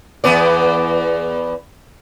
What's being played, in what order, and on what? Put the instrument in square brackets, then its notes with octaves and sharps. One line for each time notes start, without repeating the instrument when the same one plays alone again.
[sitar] E2 B3 D5